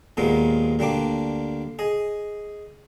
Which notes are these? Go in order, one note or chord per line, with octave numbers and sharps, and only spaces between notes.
D#2 A#2 G#3 A#3 B3
D2 G3 A#3 D4 D6
G#4 D#5